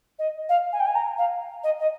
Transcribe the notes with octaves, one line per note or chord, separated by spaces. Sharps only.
D#5
F5
G#5
G5
G#5
A#5
F5
D#5
D#5